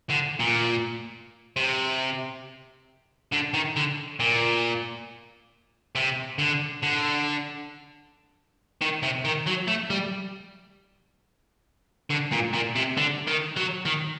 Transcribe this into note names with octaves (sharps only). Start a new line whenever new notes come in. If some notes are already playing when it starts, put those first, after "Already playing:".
D3
A#2
C3
D3
D#3
D3
A#2
C3
D3
D3
D#3
C3
D#3
F#3
A3
G3
D3
A#2
A#2
C3
D3
D#3
F#3
D#3